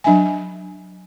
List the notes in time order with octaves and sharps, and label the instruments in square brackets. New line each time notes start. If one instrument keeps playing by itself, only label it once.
[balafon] F#3 D4 E5 G#5